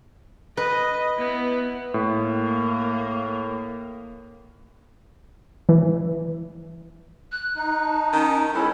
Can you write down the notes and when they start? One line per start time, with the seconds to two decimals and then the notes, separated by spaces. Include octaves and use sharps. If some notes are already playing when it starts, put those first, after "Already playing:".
0.57 B4 D#5
1.18 B3 E4
1.94 A2 A#3
5.69 E3
7.32 F#6
7.56 D#4 F#6
7.84 A5
8.13 D#3 C#4
8.54 G#3 B3 C#4 E4 A4 B5